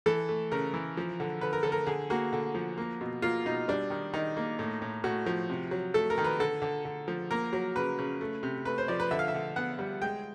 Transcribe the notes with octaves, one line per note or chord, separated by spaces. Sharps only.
E3 A4
A3
C#3 A#4
E3
F3
D3
D3 B4
A#4
D3 A4
A#4
D3 G#4
A#3 F#4
D3
F3
A#3
B2
A#3 F4
B2 D#4
G3 D4
D#3
D#3 D#4
A#3
A2
A2
A2 F#4
F3
C3
F#3
A3 A4
A#4
D#3
B4
D3 A4
D3
D3
F3
A#3 A#4
F#3
C#3 B4
C#3
A3
C3
A3 B4
C5
F3 D5
B4
D3 E5
F5
E5
D3
B3 F#5
G3
G#3 G5